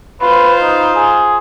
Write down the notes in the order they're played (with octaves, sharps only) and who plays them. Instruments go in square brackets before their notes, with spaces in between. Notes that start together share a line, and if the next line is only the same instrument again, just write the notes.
[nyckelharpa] F4 C5 [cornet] B4
[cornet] D#4
G#4